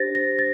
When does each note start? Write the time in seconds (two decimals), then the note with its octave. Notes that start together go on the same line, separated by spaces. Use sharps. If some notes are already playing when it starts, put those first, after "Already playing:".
Already playing: D4 G4 C5 A6 A#6
0.15 A#6
0.39 A6